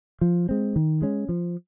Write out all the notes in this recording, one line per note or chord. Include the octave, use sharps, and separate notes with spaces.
F3
G#3 C4
D#3
G#3 C#4
F3